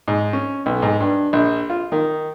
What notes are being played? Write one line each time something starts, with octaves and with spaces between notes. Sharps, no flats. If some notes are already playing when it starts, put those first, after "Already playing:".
G#2
C#4
B1
G#2
G2
A#1
F4
D#3